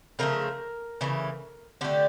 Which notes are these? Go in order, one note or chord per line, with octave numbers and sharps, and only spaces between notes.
C#3 F3 A3 A#4
C#3 E3 A3
D3 A3 G4